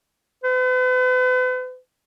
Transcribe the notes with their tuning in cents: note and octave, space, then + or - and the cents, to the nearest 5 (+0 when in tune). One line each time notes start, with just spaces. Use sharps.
B4 +40